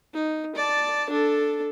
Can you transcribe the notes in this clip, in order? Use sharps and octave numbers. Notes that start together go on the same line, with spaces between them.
D#4
D5 A5
D4 A4